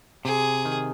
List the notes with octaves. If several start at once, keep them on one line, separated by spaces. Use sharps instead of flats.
C3 G#4
D#3